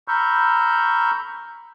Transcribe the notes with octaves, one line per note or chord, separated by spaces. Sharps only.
A#5 B5 C#6 E6 F6 G6